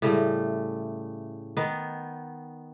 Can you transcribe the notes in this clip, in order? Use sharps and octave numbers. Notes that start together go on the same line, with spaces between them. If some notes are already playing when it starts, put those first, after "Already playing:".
A2 C#3 G3 A3
D#3 B3